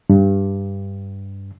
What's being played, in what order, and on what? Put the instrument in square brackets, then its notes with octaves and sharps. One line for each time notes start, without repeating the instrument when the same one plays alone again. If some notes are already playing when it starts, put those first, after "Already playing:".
[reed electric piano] G2